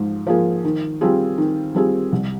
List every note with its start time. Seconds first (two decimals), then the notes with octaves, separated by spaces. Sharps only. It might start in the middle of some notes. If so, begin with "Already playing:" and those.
Already playing: G#2 F3
0.27 F3 A#3 F4 G#4
0.65 D#3
1.01 G3 C4 F4 G#4
1.38 D#3
1.75 G3 C4 F4 G#4
2.12 C2